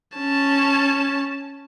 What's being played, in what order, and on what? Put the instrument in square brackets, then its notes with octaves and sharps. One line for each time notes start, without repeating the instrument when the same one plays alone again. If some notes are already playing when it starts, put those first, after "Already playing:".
[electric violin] C#4 A5